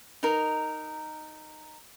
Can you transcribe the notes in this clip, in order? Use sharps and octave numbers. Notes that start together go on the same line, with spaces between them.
D#4 A#4